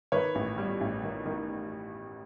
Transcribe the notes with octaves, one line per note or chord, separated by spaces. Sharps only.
D#3 B4 C#5
A1
G3
A1
D#3
D#3